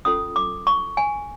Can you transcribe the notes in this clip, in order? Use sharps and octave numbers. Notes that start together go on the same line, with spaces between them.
C#4 F4 A4 D#6
D6
C#6
G#5